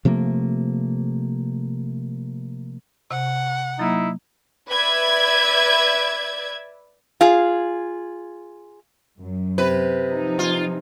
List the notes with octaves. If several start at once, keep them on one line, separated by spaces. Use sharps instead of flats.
C3 F3 A3 A#3
C3 F#5
F#3 A#3 D#4 E4
B4 D5 E5 G#6
F4 G#4
F#2
C3 B4
F3 D#4
F4 D5 G#5